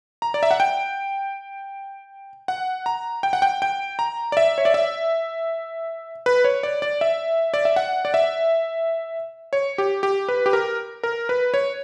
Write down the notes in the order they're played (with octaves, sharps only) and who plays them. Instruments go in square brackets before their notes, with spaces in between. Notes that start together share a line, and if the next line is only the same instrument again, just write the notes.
[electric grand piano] A#5
D5
E5
F#5
G5
F#5
A#5
G5
F#5
G5
G5
A#5
D5
E5
C#5
D5
E5
B4
C#5
D5
D5
E5
D5
E5
F#5
D5
E5
C#5
G4
G4
B4
G4
A#4
A#4
B4
C#5